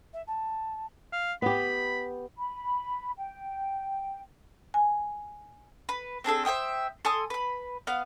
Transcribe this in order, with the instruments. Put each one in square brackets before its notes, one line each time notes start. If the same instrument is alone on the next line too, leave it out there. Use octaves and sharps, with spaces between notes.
[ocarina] E5
A5
[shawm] F5
[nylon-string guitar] B3 G4 [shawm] B5
[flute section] B5
G5
[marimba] G#5
[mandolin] B4
C4 D4 G#4 A4
C5 E5 G5 D#6
A4 G#5 C6 D#6
B4 B5
B3 F5